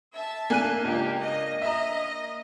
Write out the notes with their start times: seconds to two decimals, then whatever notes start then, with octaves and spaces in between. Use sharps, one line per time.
0.14 E5 A5
0.50 A#3 D4 G#5 F#6 D#7
0.85 C#2 G4
1.20 D#5
1.62 D#5 E5 A#5